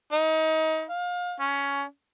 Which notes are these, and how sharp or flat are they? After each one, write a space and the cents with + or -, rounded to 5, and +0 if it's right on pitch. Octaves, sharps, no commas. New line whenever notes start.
D#4 +30
F5 +30
C#4 +15